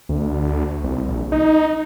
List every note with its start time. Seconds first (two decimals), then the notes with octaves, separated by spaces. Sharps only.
0.09 D2
0.84 C2
1.09 A#1
1.32 D#4